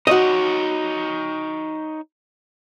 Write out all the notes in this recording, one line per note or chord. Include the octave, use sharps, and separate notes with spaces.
D#4 F#4 C#5 D#5